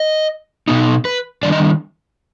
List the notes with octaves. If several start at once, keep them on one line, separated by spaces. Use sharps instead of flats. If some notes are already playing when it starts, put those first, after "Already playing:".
Already playing: D#5
B2 B3 D#4
B4
D#3 G3 D4 D5
D#5